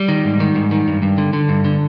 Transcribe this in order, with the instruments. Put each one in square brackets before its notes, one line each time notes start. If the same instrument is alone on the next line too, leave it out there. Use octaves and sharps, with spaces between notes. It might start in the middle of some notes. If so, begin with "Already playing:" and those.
Already playing: [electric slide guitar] G3
D#3
G#2
D#3
G#2
D#3
G2
G2
D3
D3
G2
D3